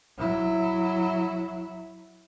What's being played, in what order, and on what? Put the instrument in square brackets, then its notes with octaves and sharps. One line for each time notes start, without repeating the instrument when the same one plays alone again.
[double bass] F#3 E4